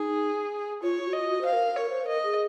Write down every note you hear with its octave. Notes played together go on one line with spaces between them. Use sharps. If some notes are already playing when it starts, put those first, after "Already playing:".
Already playing: D#4 G#4
F4 C#5
F#4
D#5
F#4
C5 F5
A#4
A#4 C#5
C5
A#4 D#5
G#4